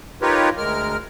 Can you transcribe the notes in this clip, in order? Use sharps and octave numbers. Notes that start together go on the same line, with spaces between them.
D#4 F4 G4 A#4 B4 C#5
D2 G#3 A#4 F6